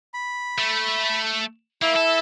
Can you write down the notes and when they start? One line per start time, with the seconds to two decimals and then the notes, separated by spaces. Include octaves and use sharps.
0.14 B5
0.58 A3
1.82 A#3 E4 E5
1.96 A4